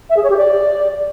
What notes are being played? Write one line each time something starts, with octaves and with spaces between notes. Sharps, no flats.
E5
G#4
C#5
G4
D5